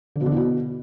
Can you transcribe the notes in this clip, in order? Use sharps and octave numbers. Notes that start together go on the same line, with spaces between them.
D3
B2
D3
E2
B2